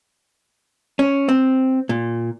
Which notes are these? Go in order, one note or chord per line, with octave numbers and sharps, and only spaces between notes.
C#4
C4
A#2